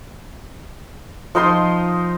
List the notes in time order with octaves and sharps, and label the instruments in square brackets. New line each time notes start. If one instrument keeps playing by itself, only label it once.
[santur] F3 D#4 C5 C6